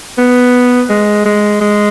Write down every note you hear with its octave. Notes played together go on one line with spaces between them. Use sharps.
B3
G#3
G#3
G#3